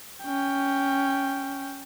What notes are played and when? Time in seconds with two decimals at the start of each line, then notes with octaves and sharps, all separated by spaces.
0.24 C#4 G5